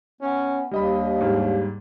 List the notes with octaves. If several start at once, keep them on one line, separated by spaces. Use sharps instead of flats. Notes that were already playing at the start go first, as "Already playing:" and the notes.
B3 C#4
D#2 G3 D4 D#5 B5
G#2 G3